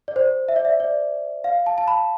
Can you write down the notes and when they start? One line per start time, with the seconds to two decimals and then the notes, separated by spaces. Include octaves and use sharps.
0.08 D5
0.16 C5
0.48 E5
0.56 D5
0.65 E5
0.80 D5
1.44 F5
1.66 A5
1.78 A5
1.88 B5